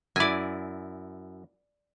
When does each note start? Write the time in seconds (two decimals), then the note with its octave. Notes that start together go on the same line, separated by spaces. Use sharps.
0.16 F#2 E4 D5 G#5